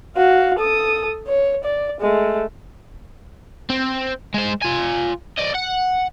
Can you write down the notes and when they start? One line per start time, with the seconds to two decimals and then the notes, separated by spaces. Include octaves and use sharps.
0.16 F#4 F5
0.59 A4 D#6
1.27 C#5
1.64 D5
2.01 G#3 A3
3.70 C4
4.34 G#3 C5
4.62 F4 G#5
5.38 D5 D#5
5.55 F#5